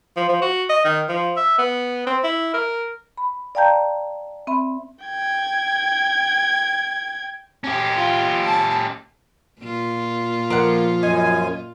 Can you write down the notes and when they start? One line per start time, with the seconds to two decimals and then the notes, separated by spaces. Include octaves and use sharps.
0.17 F3
0.29 F3
0.42 F#4
0.69 D#5
0.85 D#3
1.09 F3
1.37 E5
1.58 B3
2.06 C4
2.24 E4
2.54 A#4
3.17 B5
3.55 D5 F5 G5 A5 A#5 G6
4.47 C4 E5 B5
5.05 G5 G#6
7.64 C#4 G4
7.95 F4
8.45 A5
9.60 A#2 F4
10.50 F3 A#3 F#5
11.03 F#2 D#4 G#5